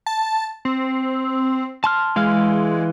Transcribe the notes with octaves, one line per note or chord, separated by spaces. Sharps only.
A5
C4
A5 C6 F6
E3 G#3 F5 F6